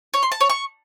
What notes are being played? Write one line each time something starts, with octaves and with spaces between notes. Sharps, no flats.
C#5
C6
A5
C#5
C#6